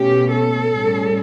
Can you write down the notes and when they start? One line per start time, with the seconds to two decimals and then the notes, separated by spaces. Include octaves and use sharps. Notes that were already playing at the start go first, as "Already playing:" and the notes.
Already playing: B2 A3 C#4 G4
0.31 A4
0.71 A2 G3 C#4